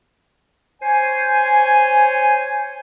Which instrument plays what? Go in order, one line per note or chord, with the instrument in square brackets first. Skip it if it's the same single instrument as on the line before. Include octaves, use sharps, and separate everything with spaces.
[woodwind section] C5 C#5 G#5